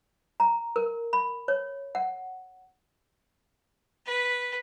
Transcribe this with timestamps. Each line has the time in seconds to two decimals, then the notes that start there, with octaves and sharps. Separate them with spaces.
0.40 A#5
0.76 A#4
1.13 B5
1.48 C#5
1.95 F#5
4.06 B4